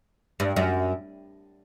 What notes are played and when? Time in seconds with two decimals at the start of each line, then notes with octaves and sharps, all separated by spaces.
0.40 G2
0.56 F#2